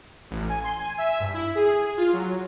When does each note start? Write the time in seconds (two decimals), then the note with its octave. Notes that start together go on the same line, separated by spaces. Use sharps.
0.30 A1
0.49 G#5
0.64 C6
0.79 G#5
0.98 E5
1.20 G2
1.34 E4
1.55 G#4
1.97 F4
2.13 F#3